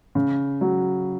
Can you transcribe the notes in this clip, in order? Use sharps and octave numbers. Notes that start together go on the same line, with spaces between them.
C#3
F#3